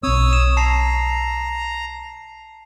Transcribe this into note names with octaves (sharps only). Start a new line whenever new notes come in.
B1 C4 C#5 D#6 E6
E7
A5 A#5 C7